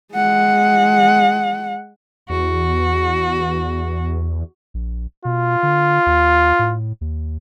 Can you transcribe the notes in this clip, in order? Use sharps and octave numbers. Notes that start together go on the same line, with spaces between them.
G#3 F#5
E2 F#4
A#1
B2 F4
D3
D#2
A2
D#2